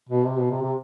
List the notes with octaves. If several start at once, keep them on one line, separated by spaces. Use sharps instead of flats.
B2
C3
B2
C3
C3